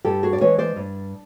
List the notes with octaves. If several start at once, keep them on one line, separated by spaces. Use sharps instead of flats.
G2 G4 A4
F#4 G#4
D5
E3 G#3 B4 C#5
C5 D5
G2